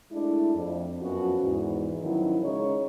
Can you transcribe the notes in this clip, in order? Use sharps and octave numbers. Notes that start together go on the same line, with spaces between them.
G#3 A3 D4 E4
F2
F#2 F3 B3 C#4 F#4
E2 G#2
D#3 F3 F#3 C#4 E4
C#3 G#3 D#4 C#5